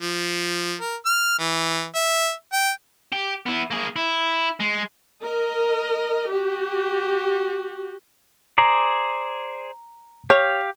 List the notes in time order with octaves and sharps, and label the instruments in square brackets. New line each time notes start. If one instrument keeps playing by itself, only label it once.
[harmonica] F3
A#4
F6
E3
E5
G5
[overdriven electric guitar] G4
B3 E4
A#3 G#4
E4
G#3
[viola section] A#4 D#5
F#4 G4
[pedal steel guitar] G#4 C5 D5 [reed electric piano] A#5
[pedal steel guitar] G4 F5 [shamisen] C#5